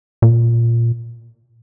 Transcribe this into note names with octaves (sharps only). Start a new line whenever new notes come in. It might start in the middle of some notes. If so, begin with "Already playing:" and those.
A#2